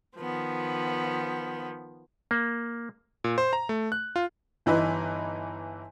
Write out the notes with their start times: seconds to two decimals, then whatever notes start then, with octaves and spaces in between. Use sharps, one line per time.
0.17 D#3 F3 B3
2.31 A#3
3.24 A#2
3.38 C5
3.53 A#5
3.69 A3
3.92 F#6
4.16 F4
4.66 G1 E3 D#4 E4 B4